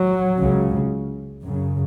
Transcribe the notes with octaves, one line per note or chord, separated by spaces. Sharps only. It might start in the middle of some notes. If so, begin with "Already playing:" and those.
Already playing: F#3
C#2 C#3
F#2 C#3